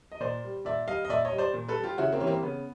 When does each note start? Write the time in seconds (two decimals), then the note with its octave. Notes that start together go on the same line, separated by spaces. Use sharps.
0.12 D#5
0.20 A#2 C5 D5
0.44 G3
0.65 A#2 D5 E5
0.87 G3 D#5 F5
1.05 D#5
1.09 A#2 D5 E5
1.25 C#5 D#5
1.31 G3
1.38 C5 D5
1.54 A#2
1.68 A4 B4
1.76 G3
1.83 F4 G4
1.98 C#3 E4 F#4
2.12 A#3 C4
2.20 E3 G3 C#4
2.27 A#3 C4
2.43 C#3 B3